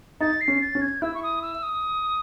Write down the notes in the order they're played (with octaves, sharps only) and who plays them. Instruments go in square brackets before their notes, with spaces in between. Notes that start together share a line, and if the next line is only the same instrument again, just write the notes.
[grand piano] D#4 [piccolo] A6
[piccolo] C7
[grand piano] C#4
[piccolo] A6
[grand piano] C#4
[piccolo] G#6
[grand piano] E4 [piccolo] E6
[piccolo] C#6
D#6
E6
D#6